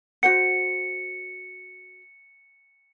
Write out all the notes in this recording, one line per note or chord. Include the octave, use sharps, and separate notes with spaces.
F#4 C5 F#5 C#7